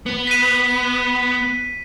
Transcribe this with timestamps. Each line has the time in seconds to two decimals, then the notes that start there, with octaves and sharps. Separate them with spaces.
0.06 B3
0.27 B6 D#7